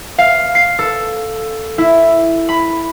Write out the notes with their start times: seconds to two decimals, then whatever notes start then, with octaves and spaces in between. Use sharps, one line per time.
0.18 F5
0.55 C7
0.79 A4
1.78 E4
2.49 B5